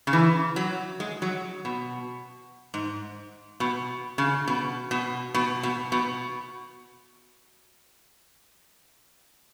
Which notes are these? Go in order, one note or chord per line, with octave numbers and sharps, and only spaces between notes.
C#3
E3
F#3
G#3
F#3
B2
G#2
B2
C#3
B2
B2
B2
B2
B2